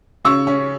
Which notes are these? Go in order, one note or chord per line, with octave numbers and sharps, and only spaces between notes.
C#3 C#6 E6
C#4